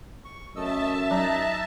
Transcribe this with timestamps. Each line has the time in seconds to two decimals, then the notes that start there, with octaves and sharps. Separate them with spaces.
0.25 C#6
0.56 F#2 A3 D#5 E5 A5 E6
1.11 F#3 D#4 A#5 F#6